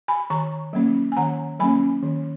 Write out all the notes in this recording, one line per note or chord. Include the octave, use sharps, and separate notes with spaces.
G#5 B5
D#3 A#5 C#6
F#3 A#3 C#4
G#5
D#3 F#5 A#5
F#3 A#3 C#4 G#5 B5
D#3